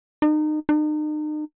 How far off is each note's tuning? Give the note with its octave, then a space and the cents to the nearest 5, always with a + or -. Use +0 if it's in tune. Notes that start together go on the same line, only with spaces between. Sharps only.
D#4 -30
D#4 -40